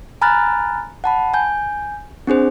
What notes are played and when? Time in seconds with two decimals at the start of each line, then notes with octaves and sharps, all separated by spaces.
0.22 G#5 A#5 B5 F6 F#6 A6
1.04 F#5 A5 B5
1.34 G#5 G6
2.27 C4 D4 G#4 C5